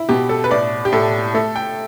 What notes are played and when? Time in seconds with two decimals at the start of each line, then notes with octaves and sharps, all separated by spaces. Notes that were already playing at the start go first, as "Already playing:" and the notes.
Already playing: E4
0.09 B2 G4
0.29 A4
0.44 B4
0.50 A2 D5
0.85 G4
0.92 A2 A4
1.34 A3 A4
1.56 G5